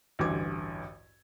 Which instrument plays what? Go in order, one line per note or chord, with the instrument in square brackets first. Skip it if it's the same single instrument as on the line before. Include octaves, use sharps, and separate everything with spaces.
[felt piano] A1 D2 G2 E3 D6 G#6